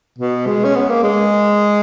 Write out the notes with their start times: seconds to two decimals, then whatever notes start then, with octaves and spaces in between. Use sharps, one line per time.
0.19 B2
0.47 G#3
0.65 C#4
0.75 B3
0.89 A#3
1.03 G#3